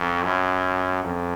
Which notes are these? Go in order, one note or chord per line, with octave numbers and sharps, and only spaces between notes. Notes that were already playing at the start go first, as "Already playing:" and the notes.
Already playing: F2
F#2
F2